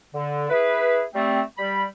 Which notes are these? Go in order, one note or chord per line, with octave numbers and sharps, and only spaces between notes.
D3
E4 G#4 B4
G3 A3 C4
G3 B5